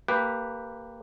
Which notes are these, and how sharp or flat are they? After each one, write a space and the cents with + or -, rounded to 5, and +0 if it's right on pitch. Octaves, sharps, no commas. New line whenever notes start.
A#3 -15 G4 +5 B4 +0